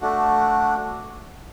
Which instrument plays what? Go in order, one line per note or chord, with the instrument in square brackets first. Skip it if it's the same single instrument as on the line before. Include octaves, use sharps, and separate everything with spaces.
[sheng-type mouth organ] A3 D4 F#4